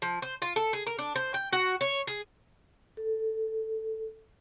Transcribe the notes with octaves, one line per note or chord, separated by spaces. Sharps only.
F3
C5
F4
A4
G#4
A#4
D4
C5
G5
F#4
C#5
G#4
A4